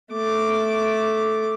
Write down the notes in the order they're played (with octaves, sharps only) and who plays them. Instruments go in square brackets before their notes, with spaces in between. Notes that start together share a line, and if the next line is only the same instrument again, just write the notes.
[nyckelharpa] A3 D6